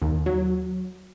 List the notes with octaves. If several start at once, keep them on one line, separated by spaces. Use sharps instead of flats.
D#2
F#3